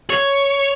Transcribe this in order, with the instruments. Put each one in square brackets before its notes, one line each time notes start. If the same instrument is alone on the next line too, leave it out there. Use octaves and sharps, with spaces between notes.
[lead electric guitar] C#5